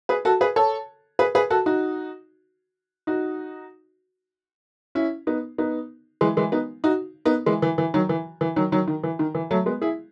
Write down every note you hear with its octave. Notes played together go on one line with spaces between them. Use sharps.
G#4 B4
F#4 A4
G#4 B4
A4 C#5
G#4 B4
G#4 B4
F#4 A4
D#4 F#4
D#4 F#4
C#4 E4
B3 D#4
B3 D#4
E3 G#3
E3 G#3
B3 D#4
D#4 F#4
B3 D#4
E3 G#3
E3
E3
D#3 F#3
E3
E3
D#3 F#3
D#3 F#3
D#3
E3
D#3
E3
F#3 A3
G#3 B3
E4 G#4